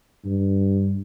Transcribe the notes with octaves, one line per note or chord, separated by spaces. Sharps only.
G2